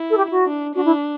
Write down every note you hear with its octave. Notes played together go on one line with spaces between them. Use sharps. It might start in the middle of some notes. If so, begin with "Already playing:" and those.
Already playing: E4
A4
G4
F#4
D4
D4 F#4
E4